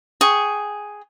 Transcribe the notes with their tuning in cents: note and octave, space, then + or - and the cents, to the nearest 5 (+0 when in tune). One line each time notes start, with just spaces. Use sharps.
G#4 +0 G5 -15 C#6 +0